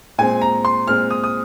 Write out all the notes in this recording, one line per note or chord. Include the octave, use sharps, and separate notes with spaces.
A#2 G#3 C4 G#5
A#5
C6
A#2 G#3 C4 F6
D#6
D#6